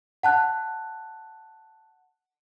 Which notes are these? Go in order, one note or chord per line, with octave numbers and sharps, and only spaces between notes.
F#5 A5 F#6